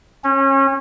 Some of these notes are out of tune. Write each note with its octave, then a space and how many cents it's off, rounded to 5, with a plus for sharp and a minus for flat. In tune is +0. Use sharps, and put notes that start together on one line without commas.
C#4 -30